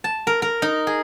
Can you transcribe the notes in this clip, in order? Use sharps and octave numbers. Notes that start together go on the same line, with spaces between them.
A5
A#4
A#4
D#4
G#4